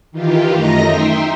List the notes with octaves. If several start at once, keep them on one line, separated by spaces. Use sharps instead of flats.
D#3 E3 F4 G4
F#2 A3 D#5 A#5 A#6
D#4 E5 G5 C6